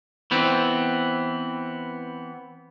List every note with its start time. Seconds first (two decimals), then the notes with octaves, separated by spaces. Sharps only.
0.31 E3 B3 C4